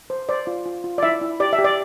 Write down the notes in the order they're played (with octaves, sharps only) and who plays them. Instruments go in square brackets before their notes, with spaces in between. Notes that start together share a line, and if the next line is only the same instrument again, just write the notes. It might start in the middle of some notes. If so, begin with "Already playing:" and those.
[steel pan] C5
C5 D5
F4
F4
F4
D5
E4 E5
E4
G4 D5
E5
G4
D5